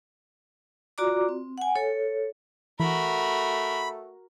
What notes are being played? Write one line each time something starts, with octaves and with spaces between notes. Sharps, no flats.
F4 F#4 D5 A#5 D6
C4
F#5 G#5
A4 C#5
E3 A3 F#4 A#4 B5